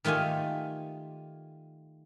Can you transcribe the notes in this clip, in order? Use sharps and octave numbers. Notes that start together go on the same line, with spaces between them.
D#3 A3 F4 G4 G#5